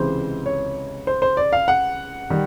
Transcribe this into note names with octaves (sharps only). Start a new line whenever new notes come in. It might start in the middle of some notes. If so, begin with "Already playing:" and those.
Already playing: C#2 C3 E3 G#3 C5
C#5
C5
C5
D5
F5
F#5
D#3 G3